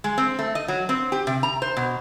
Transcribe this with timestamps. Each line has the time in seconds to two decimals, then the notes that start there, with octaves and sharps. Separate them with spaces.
0.04 G#3
0.18 C4
0.39 A3
0.55 D#5
0.68 F#3
0.89 C4
1.12 G4
1.27 C3
1.43 A#5
1.62 C5
1.77 B2